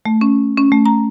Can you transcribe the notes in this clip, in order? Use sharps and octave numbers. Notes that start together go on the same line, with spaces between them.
A3
C#4
C#4
A3
A#5